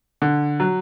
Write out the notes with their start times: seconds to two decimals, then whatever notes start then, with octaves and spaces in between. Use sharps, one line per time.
0.22 D3
0.60 F#3